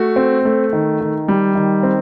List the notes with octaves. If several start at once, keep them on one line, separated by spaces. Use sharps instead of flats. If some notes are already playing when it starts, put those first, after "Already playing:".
Already playing: A3 F#4
C4
A3
D#3
D#3
G3
D#3
C4